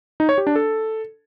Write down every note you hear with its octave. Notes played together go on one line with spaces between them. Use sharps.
D#4
C#5
G4
D4
A4